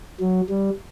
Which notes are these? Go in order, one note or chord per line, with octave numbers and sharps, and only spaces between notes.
F#3
G3